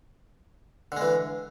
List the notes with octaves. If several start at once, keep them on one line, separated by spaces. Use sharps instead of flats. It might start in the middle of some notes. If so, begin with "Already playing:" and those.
D3 E3 G#3